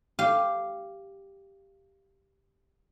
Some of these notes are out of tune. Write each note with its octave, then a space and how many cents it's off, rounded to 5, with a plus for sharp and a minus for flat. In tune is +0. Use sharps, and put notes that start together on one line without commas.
G4 +0 F5 -15